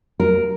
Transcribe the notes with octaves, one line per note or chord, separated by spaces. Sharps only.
A#4